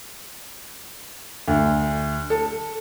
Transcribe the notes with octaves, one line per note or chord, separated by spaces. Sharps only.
D2
A4